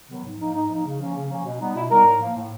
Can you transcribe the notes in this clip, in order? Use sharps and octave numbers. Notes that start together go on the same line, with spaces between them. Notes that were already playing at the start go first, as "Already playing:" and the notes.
C3 D#3 F#3 B3
G#2
F3 A#3 D#4
G#2 D#4
F3 A#3 D#4
C#3
F3 A#3 C#4
C#3
F3 A#3 C#4
B2
G3 B3 D#4
B2 E4
G3 B3 D#4 A#4
A2
F3 A#3
A2